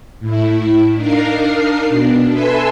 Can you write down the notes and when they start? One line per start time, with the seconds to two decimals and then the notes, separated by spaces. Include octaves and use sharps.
0.20 A2 E4
0.95 D4 D#4 A#4 F5 C7
1.89 B2 D4
2.30 A4 B4 E5 G#5 C6 E6